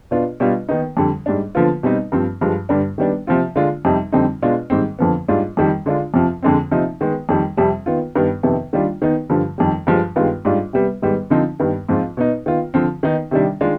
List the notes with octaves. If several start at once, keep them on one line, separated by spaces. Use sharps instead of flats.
B2 B3 D4 F4
B2 G3 D4 F4
D#3 B3 D#4
F2 D3 G3
G#2 G3 D4
D3 F3 B3 F4
B2 G3 C4 D#4
G2 F3 C4
G2 F3 G#3
G2 D3 G3 D4
D#3 G3 B3 D4
C3 F3 C4 F4
D3 G#3 D4 F4
F2 C3 G3 C4 D#4
F2 D3 G3 C4 D#4
B2 G#3 D4 F4
G#2 D#3 G3 C4
F2 D3 F3 B3
G#2 G3 D4 F4
F2 D#3 G3
D3 G#3 D4 F4
F2 C3 F3 C4
F2 D3 G#3 C4
C3 F3 C4 D#4
D#3 G#3 B3
F2 D#3 G3
F2 C3 G3
D#3 B3 F4
G2 D#3 B3
F2 C3 D#3 B3
D#3 G3 D4 F4
D#3 B3 D#4
G2 D3 F3
F2 D#3 G3
G2 F3 G#3
G2 D#3 G#3 B3 F4
G#2 G3 D4 F4
C3 G3 B3
G#2 D#3 G3 B3
D3 F3 C4 D#4
G2 D#3 B3
G#2 F3 C4 F4
B2 B3 D#4
D#3 B3 F4
D3 F3 C4
D#3 B3 D#4
C3 D#3 G3 D4
D#3 G#3 D4 F4